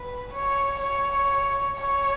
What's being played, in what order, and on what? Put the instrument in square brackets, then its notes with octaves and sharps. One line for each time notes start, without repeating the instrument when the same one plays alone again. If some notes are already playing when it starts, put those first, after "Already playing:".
Already playing: [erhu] B4
C#5
C#5
C#5